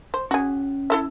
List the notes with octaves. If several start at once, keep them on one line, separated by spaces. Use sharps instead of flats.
C5
C#4 F#4 G#4
E4 A4 E5